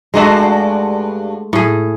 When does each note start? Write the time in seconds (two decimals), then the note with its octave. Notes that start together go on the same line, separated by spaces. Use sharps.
0.14 G2 G#3 A3 D4 F#4
1.53 A2 G#4